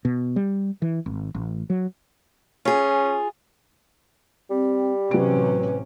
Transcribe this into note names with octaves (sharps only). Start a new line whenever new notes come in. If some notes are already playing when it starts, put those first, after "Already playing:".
B2
G3
E3
G#1
A1
F#3
C#4 F4 G#4
G3 C4
A1 C3 F#3 C#4 B4 D7